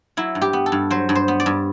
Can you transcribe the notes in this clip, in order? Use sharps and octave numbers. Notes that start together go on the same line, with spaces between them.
F#3 E4
G2
G4
B3
A4
G2
F#3 C5
G2
C5
B3
D5
G2